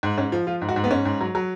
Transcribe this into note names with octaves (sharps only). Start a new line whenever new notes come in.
G#2
G#2 C#4
F3
F3 F4
G#2
F#4
G#2
B3
G#2 C#4
G#2
F#3
F#3